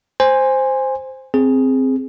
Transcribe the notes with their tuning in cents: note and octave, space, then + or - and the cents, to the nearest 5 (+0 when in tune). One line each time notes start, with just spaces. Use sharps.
C5 +0 G#5 -15
C4 +0 G#4 +0